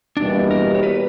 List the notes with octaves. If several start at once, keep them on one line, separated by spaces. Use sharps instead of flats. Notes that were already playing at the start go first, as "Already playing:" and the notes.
E2 B2 G3 A#3 D4 E4
A#4
C#5
B4